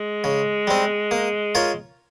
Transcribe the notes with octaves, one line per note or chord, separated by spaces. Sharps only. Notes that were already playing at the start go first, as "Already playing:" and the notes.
Already playing: G#3
C#3
G3 C4
A#3
F4 A#4 C#5